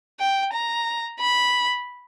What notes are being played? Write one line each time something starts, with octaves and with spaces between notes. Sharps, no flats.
G5
A#5
B5